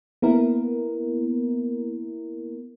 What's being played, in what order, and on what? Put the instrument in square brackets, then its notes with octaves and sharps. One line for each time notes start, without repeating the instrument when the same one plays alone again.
[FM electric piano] A#3 B3 E4 A#4